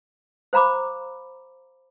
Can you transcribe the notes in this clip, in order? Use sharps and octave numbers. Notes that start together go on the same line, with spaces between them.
C5 F5 A#5 B5 D6